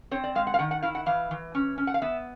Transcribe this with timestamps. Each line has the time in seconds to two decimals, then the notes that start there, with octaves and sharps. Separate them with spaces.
0.11 C4 C#5
0.24 D5
0.35 G#3 F5
0.47 F#5
0.54 F5
0.59 D#3 F#5
0.71 F#5
0.82 E4 F5
0.95 F#5
1.06 E3 F5
1.31 E3
1.55 C#4
1.78 C#4
1.87 F#5
1.94 F5
2.02 B3 E5